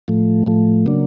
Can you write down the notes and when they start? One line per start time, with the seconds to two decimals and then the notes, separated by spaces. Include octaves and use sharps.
0.08 A2 F3 A3
0.46 A2 F3 A3
0.86 C#3 F#3 A#3 D4